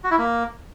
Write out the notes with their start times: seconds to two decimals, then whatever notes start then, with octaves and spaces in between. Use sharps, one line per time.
0.04 F#4
0.11 E4
0.18 A#3